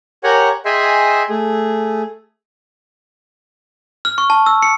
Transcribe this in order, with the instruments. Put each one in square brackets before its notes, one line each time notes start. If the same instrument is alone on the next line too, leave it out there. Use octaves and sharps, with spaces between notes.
[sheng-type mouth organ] G4 A#4 C#5 F#5 G#5 A#5
G#4 D#5 E5 G5 G#5 C6
A3 G#4
[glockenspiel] F6
C#6
A5
E6
C#7